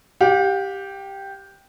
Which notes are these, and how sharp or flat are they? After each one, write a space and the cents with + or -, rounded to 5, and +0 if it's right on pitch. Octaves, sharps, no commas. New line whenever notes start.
G4 +0 F5 +45